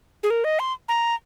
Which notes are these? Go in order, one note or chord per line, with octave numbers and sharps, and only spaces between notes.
G#4
A#4
D#5
C6
A#5